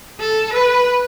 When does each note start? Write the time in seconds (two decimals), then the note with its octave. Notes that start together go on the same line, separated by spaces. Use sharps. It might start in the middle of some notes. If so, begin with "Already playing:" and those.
0.20 A4
0.54 B4